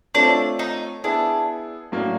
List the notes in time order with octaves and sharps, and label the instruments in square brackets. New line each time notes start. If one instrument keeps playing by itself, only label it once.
[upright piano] A3 C4 F4 A4 C#5 [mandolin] D4
[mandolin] D#4
[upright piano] B3 E4 G#4 [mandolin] D4
[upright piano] A2 F#3 A#3 D4